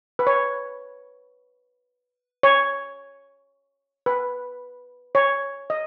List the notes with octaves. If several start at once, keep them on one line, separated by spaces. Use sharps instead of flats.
B4
C#5
C#5
B4
C#5
D#5